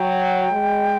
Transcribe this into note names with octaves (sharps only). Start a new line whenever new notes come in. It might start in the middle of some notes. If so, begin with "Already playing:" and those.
Already playing: F#3 G5
G#3